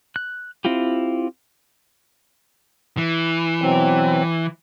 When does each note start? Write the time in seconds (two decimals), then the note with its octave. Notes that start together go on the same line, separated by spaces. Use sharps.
0.16 F#6
0.65 C4 E4 F4 G4
2.97 E3
3.62 B2 F#3 C4